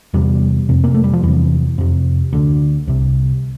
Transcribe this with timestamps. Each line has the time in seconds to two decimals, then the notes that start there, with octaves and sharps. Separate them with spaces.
0.14 E2 C3 G3
0.69 F2 C3
0.84 A#3
0.94 A3
1.04 G3
1.13 F3
1.23 E2 C3 E3
1.78 F2 C3
2.33 D2 D3
2.87 C2 C3